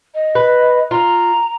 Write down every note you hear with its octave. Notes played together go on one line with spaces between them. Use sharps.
D#5
B4
F4 A#5